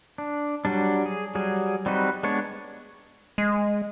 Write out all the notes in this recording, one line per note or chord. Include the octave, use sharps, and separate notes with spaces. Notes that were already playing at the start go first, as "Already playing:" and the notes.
D4
F#3 G3 D4
G#4
F#3 G3 G#4
G3 C4 D#4 F#4 B4
G#3 B3 D4 C#5
G#3